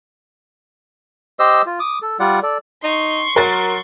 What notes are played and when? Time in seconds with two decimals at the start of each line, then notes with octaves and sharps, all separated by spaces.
1.39 G4 C5 D#5 E6
1.66 F4
1.80 D6 D#6
2.02 A4
2.19 G3 F4 D5 F#5
2.43 A4 D5
2.84 D#4 C6 C#6
3.36 F#3 A#4 A6